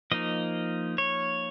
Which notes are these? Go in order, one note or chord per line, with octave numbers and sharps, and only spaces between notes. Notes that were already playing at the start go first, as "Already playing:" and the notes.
F3 A#3 D#4 D#5
C#5